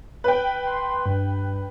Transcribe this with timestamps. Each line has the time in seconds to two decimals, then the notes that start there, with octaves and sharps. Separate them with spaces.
0.24 B4 G5
0.66 C6
1.06 G2